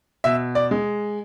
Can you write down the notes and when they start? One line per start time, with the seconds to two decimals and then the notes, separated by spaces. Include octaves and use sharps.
0.24 B2 E5
0.55 D5
0.71 G#3